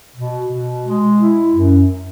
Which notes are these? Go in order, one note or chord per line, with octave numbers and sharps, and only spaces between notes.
B2
B2
G#3
E4
F#2